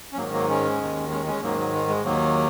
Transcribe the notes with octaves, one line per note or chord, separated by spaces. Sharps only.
C#4
G#2 D#3 F#3 A#3
F#3 A#3
G#3 C#4
D#2 D#3
G#3 C#4
G#3 C#4
G#2 D#3 F#3 A#3
F#3
G#3
G#3
D#2 D#3 F#3 A#3